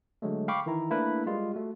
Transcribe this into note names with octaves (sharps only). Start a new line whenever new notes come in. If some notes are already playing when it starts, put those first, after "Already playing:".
D3 F#3 G#3 A3
F5 G5 B5 C#6 D6
D#3 E3 E4 A#5
A3 A#3 D4 E4 A#4 B4
G3 G#3 F4
A3 F#4